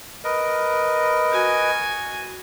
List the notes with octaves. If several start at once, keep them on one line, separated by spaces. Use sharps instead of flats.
A#4 B4 D#5
F#4 G#5